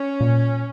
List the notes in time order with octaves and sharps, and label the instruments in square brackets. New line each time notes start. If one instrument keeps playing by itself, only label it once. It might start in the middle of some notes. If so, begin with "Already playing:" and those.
Already playing: [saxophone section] C#4
[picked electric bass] A#2